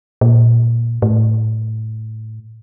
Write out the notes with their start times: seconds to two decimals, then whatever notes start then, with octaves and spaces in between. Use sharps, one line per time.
0.21 A#2
1.02 A2